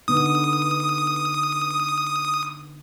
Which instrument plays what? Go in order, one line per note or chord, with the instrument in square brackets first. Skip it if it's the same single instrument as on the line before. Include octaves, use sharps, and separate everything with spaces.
[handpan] D3 B3 D#4 [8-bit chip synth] D#6